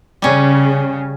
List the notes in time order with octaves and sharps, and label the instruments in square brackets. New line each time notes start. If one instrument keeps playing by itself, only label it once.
[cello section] C#3 [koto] G3 C#4